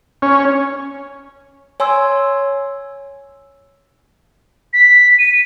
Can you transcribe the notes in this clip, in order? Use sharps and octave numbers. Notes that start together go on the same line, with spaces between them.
C#4
C#5 G#5 C6 E6 G#6
B6
D#7